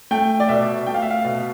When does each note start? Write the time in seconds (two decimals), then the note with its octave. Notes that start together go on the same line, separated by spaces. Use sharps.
0.11 A3 G5
0.40 D5
0.49 B2 E5
0.87 A3 G5
0.94 F5
1.02 E5
1.10 F5
1.25 B2